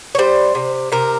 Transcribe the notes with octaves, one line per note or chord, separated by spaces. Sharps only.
C#5
G3 C5
C3
C3 A#4